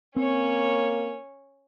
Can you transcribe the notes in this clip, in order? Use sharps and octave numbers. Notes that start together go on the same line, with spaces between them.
A#3 C4 C#4 C#5